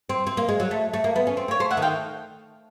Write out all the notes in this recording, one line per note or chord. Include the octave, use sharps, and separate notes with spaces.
C4
C4
A#3
G#3
F#3
A3
A3
A#3
B3
C#4
C4
A#3 C#5
A3 C5
E5 F#5
D#3
F5 G5